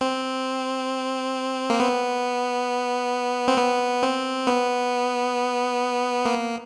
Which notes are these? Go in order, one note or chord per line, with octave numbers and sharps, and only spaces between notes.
C4
A#3
B3
C4
B3
C4
B3
A#3